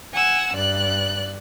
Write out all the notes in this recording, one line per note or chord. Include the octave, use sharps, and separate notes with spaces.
F#5 G#5 E6
G2 D5 F#6